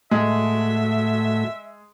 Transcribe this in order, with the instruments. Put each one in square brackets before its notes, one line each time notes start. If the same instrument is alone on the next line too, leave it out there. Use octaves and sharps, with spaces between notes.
[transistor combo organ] A2 A3 F#4 [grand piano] G#3 [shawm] E5